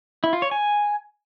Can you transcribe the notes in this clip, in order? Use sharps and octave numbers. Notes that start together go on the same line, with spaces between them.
E4
F4
C#5
G#5